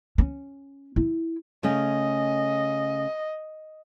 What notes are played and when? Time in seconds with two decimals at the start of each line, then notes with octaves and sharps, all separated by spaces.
0.18 C#4
0.96 E4
1.63 C#3 A3 C#4 D#5